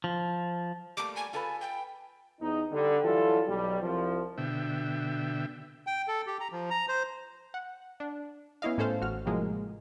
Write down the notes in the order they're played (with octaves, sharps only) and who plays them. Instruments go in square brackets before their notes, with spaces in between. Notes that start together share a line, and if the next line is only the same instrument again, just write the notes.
[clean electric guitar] F3
[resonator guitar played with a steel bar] G3 A3 A#3 [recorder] D6
[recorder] G#5
[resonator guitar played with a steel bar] F4 A4 B4 [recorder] G#5
[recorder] G5
[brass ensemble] E2 D#4
D3 G3
E3 F#3 G3 F4 A4
B1 G3
C2 F3
[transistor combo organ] B2 D3 E5 G5
[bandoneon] G5
A4
G4
A#5
F3
A#5
C5
[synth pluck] F#5
D4
B3 C#4 E4 D#5 F5
A2 C#4 A4 C5 F5
A1 F#4 F6
A2 C3 F3 G#3 A#3